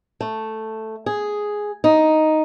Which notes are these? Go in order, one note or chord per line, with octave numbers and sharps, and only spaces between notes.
A3
G#4
D#4